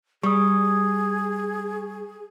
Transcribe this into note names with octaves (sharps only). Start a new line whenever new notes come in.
G3 G#4 C#6 D#6